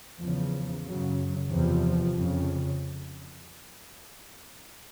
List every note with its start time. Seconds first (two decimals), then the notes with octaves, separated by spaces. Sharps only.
0.21 E2 C#3 F3
0.86 F#2 C#3 F#3
1.50 E2 C3 F3
2.16 F2 C#3